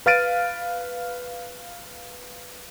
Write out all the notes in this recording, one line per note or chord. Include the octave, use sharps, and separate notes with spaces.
B4 F5 F6 A6 D7 D#7